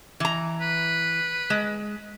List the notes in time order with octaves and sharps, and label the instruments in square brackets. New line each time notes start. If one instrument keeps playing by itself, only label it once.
[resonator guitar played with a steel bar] E3 A#5
[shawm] B4
[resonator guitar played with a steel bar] G#3